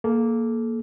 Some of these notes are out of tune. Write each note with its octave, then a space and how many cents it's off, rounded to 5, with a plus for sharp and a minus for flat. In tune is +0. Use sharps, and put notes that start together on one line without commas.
A#3 +0 A4 -35